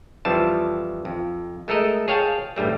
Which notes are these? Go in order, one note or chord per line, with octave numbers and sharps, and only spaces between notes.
F2 E3 F3 G3 A5
F2
G#3 A3 A4 A#4 D#5
G#4 C#5 F5 G5 A5
A1 G2 G3 A3